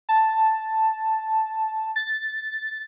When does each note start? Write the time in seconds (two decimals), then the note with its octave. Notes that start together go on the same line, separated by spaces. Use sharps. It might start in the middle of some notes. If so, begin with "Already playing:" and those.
0.09 A5
1.96 A6